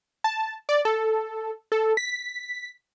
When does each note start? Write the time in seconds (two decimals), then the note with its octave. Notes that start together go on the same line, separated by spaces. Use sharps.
0.24 A5
0.69 D5
0.85 A4
1.72 A4
1.97 B6